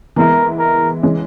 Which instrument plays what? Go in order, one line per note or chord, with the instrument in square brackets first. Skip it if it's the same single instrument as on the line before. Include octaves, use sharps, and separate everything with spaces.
[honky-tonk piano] E3 G#3 B3 E4 [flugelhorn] A#4
[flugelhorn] A#4
[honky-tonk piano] E3 G#3 C#4